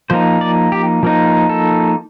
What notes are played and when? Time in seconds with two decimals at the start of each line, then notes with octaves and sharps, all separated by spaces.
0.10 F3 A#3 D#4 C5
0.41 D5
0.72 G4
1.03 F3 A#3 D#4
1.49 A4